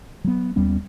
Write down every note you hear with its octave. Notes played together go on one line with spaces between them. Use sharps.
F#3 B3
D#2 G3 B3 C#4